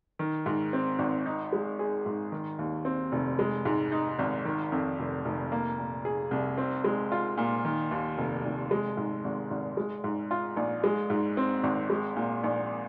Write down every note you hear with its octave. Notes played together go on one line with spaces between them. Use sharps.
D#3
G#2
C4
G#1
D#4
G#3
G#4
G#2
D#3
D#2
C4
F1
G#3
G#2
D#4
G#1
D#3
F2
F1
F1
A#3
A#2
G#4
C2
C4
G#3
F4
A#2
D#3
D#2
F1
F1
G#3
G#2
G#1
G#1
G#3
G#2
F4
A#1
G#3
G#2
C4
G#1
G#3
A#2
A#1